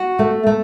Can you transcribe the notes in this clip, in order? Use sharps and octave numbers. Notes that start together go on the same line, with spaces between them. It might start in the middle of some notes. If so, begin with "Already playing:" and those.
Already playing: F#4
A3
A3